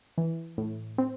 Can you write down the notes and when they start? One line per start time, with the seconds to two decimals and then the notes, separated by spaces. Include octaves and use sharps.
0.18 E3
0.58 A2
0.98 C4